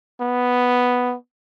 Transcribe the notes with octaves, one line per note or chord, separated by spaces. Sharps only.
B3